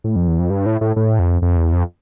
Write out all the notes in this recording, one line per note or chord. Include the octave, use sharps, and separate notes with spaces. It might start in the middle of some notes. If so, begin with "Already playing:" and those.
A2
F2
E2
F2
G2
A2
A2
A2
F2
F2
E2
F2